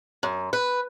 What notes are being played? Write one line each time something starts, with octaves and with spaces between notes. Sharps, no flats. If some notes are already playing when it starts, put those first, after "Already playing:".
F#2
B4